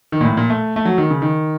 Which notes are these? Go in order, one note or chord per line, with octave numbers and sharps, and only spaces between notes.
D#3
A#2
A2
A#2
A3
A3
F#3
D#3
C#3
D#3